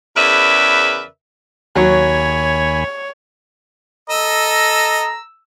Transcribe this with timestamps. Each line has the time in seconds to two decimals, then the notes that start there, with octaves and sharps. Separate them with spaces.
0.16 E2 C#3 A#4 B4 D5 E5
1.76 D#2 F#3 C#5 G#5 B5
4.10 A4 D#5 A#5 E6